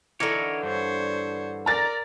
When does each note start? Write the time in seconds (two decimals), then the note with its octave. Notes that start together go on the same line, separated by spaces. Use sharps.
0.20 D3 E3 D#4 A#4 C#5
0.63 G2 C5 C#5
1.66 A#4 D5 A#5 A6 A#6